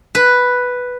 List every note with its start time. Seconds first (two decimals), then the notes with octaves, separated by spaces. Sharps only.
0.15 B4